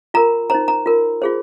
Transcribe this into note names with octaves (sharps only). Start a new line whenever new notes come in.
F4 A#4 A#5
D#4 C5 A#5
A#5
F4 A#4
F4 G#4 C5